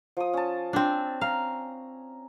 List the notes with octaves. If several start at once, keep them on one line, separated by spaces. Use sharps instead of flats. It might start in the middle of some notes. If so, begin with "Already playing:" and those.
F3 D#6
C#4 A5
C4 D4 E6
F5 A#5